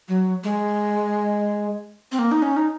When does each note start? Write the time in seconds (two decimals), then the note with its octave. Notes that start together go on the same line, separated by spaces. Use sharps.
0.08 F#3
0.44 G#3
2.12 C4
2.19 A#3
2.31 D#4
2.42 C#4
2.56 D#4